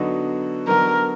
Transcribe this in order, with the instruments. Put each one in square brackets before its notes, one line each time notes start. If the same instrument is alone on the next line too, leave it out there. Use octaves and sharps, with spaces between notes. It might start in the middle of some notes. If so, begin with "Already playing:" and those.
Already playing: [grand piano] D3 F#3 B3 D#4 F#4
[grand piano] D3 F#3 B3 D#4 F#4 [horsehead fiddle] A#4